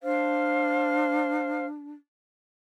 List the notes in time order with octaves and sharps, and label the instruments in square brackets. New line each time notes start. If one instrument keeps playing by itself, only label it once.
[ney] D4 [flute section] C5 F5 F6